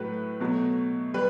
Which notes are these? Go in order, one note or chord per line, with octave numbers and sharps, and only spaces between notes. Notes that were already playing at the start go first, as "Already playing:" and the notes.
Already playing: A2 F#3 A3 B4
B2 F#3 A3
G3 B4